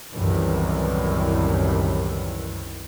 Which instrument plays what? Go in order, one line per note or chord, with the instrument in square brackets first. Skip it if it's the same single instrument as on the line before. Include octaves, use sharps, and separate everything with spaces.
[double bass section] C2 F#2 A2 D#3 E3